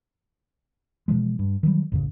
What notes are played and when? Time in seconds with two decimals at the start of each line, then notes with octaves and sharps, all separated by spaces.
1.08 B2 E3 F3 G#3
1.39 G2
1.63 D#3 E3 F#3 G3
1.92 A1 F2 C#3